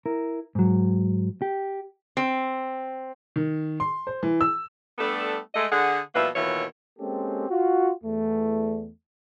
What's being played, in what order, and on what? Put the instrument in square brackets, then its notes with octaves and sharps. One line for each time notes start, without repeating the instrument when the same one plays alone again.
[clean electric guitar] E4 A#4
G#2 F#3
G4
[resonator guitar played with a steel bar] C4
[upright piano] D#3
C6
C5
E3
E6
[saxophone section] G3 A3 B3 D4 A4
G#3 A3 D#5
D3 G#4 F#5
B2 F3 G3 A#3 B4 E5
D#2 B2 E3 E4 F4 C#5
[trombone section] G#3 A#3 C4 C#4 G4 A4
F4 F#4
E2 A3